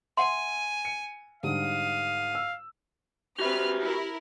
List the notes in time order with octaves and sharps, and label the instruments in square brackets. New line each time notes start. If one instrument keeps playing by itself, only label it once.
[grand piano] E5 [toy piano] F#5 C6 [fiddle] G#5
[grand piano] C#7
[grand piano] G#2 D3 G3 [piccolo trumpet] F5 [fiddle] D#6
[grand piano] E6
[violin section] C4 B4 F6 [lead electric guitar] F#4 E5 [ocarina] G4
[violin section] E4 A#4